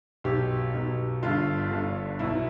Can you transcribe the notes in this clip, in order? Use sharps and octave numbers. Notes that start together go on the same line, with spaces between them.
B1 B2 G4
B1 B2
G1 G2 D3 F4
G1 G2 D3
B1 B2 E4